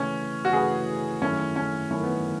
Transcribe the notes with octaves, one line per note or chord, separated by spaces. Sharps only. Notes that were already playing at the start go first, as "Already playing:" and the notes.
Already playing: C#3 E3 A3 C#4 E4 B4
F#4
C#3 E3 A3 E4 G#4 B4
F#2 D#3 A3 C#4 E4
C#4
F#2 D#3 A3 C#4 E4
B3